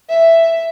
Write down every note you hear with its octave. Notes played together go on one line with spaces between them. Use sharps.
E5